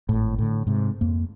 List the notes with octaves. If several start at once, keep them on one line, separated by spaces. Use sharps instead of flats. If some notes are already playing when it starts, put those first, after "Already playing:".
G#1 A2
A2 D3
G#2 C3
F2 A#3